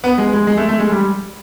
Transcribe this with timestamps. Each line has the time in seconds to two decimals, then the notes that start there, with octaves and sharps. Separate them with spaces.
0.04 B3
0.18 G#3
0.33 G#3
0.47 G#3
0.57 A3
0.69 A3
0.79 G#3
0.91 G3